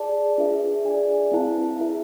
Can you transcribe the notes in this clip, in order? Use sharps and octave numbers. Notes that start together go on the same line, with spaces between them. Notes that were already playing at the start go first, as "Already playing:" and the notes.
Already playing: G#4 D5 A5
D4 F4 G#4 B4 E5
G#4 D5 G#5
C4 E4 B4 F5 A5
E4 G#4 B4 E5